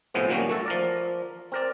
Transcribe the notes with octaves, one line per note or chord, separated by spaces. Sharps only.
A2 C3 F3 G#3 B3
A#2 D#3 F#3 G3 A#3 C#4
A3 F#4 A4
F3 A#4 D5
C4 A#4 D5